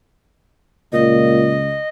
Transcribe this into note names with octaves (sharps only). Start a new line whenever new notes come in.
C#2 A#2 D#5